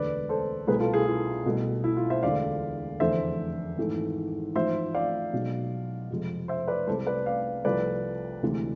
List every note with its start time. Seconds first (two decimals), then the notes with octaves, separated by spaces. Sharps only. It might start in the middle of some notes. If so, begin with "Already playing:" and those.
Already playing: E1 D2 D3 G#3 B4 D5
0.29 A4 C5
0.67 C2 B2 A3 G#4 B4
0.80 F4 A4
0.93 E4 G#4
1.06 F4
1.45 C2 B2 A3
1.84 E4
1.97 F4
2.10 C5 E5
2.23 E1 D2 D3 D5 F5
3.00 F1 E2 D3 A3 C5 E5
3.77 G#1 G#2 E3 A3
4.55 A1 G#2 F3 G#3 C5 E5
4.94 D5 F5
5.33 B1 B2 G#3
6.11 F2 C3 G#3
6.48 C5 E5
6.68 B4 D5
6.87 C2 C3 G#3 A4 C5
7.07 B4 D5
7.26 D5 F5
7.65 C2 C3 F3 A3 B4 D5
8.42 D2 C3 E3 G#3